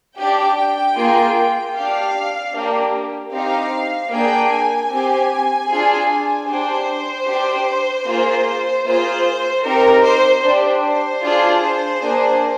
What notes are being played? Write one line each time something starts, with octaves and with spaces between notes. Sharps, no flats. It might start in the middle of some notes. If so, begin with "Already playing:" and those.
D4 G4 G5
A#3 F4 G#4
D4 G4 F5
A#3 D4 G4
C4 D#4 G4 F5
A#3 D4 G#4 G5
G#5
C4 G4
D4 F4 G#4
D4 G4 C5
D4 G4
A#3 F4 G#4
A#3 F4 G#4 C5
C4 D#4 G4 A#4
C5
D4 G4
C5
D4 F4 G#4
A#3 D4 G#4